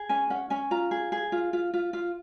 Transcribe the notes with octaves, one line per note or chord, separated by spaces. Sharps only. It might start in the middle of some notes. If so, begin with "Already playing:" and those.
Already playing: G#4
C#4 G#5
C#4 F#5
C#4 G#5
F4 A#5
G#4
G#4
F4
F4
F4
F4